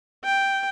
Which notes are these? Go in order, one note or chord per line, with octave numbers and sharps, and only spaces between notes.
G5